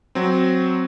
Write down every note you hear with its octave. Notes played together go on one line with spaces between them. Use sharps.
F#3 C4